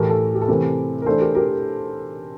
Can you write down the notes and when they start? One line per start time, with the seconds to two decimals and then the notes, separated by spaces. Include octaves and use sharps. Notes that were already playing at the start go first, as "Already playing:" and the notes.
Already playing: A2 E3 A3 G4 A#4
0.10 A4
0.34 G4
0.42 A4
0.48 C3 E3 A3 C4 G4 A#4
1.02 A#4
1.06 E3 A3 D4 A4 C5
1.21 G4 A#4
1.35 G4 A#4